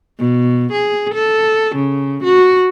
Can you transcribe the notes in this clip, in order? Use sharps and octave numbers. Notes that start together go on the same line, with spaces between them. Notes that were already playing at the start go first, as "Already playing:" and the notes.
B2
G#4
A4
C#3
F#4